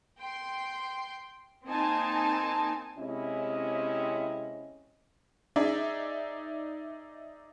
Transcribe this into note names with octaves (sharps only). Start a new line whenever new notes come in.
G5 C6
A#3 C4 D#4 G#5 A5
C3 G#3 C4 C#4 E4 D#5
D#4 G#4 D5 E5